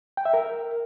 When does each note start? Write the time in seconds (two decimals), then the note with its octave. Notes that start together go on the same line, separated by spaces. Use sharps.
0.17 G5
0.25 E5
0.34 A#4